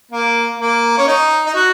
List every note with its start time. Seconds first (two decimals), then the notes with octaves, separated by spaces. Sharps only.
0.12 A#3
0.60 A#3
0.97 C#4
1.07 D#4
1.46 D#4
1.55 F#4